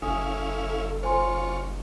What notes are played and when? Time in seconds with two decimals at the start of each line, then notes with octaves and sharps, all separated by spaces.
0.02 F#1 C#4 E4 A4 F5 G#5 D#6
1.03 F4 C5 C#5 G#5 C6